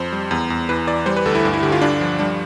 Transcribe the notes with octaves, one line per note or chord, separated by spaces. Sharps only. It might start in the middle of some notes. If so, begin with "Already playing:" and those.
Already playing: F2 C5
G3
E2
E2
E3 B4
E3 D5
G3 C5
B4
D2 A4
E4
G2
E4
D3 G4
F4
G2 D4
F3
G3 D4